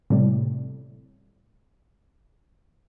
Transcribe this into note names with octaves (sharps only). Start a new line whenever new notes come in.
A2 C3 G3